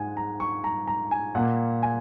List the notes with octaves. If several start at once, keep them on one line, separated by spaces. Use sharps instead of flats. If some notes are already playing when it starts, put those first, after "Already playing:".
Already playing: G#2 G#3 F#5 G#5
A#5
C#6
A#5
A#5
G#5
A#2 A#3 F#5
G#5